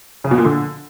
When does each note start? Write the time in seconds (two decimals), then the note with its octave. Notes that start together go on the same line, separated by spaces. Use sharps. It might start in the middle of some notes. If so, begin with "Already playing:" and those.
0.24 C#3
0.31 B2
0.38 A#2
0.45 D3